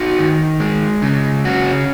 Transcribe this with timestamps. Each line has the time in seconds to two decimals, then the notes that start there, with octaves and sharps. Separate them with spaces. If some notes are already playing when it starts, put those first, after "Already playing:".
Already playing: D#4 F#4
0.19 D#3
0.60 G#3
1.02 C#3
1.45 C#4 F#4